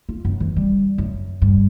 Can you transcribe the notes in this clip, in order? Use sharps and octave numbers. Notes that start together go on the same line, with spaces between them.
F4
F#2
E3
G3
F#2
G2